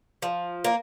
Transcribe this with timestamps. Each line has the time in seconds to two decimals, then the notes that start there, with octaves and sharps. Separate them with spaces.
0.22 F3
0.64 A#3